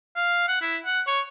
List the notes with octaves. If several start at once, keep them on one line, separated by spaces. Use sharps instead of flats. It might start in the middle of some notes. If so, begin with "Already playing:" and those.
F5
F#5
E4
F#5
C#5